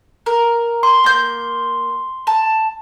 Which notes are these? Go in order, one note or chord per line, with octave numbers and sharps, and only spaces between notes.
A#4
C6
A#3 G6
A5